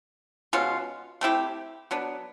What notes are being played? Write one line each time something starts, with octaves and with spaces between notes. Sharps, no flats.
B2 G#3 C#4 F4
A3 C4 E4 G4
F#3 B3 D4